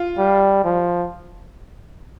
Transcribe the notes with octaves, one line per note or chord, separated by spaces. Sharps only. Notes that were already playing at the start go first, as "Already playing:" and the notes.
Already playing: F4
G3
F3